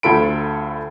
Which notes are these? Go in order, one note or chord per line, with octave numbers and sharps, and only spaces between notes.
D2 F4 A4 B5 D7